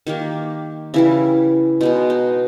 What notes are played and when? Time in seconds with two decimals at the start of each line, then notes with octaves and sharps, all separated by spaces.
0.07 D#3 A#3 G4
0.94 C#3 E3 G3 E4
1.81 B2 G#3 B3 D#4
2.10 D#4